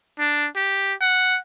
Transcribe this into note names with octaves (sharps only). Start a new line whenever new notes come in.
D4
G4
F#5